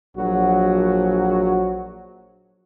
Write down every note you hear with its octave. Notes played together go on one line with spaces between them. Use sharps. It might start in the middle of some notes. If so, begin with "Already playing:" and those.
A#1 F#3 F#4